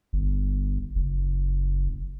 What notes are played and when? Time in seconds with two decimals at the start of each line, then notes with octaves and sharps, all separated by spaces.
0.13 G1
0.95 F#1